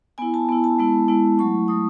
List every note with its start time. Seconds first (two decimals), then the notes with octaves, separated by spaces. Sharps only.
0.18 B3 E4 G#5
0.34 A5
0.49 B3 E4
0.64 A5
0.79 G#3 B3 E4
1.08 G#3 B3 E4
1.38 F#3 A3 E4 C#6
1.68 F#3 A3 E4 D#6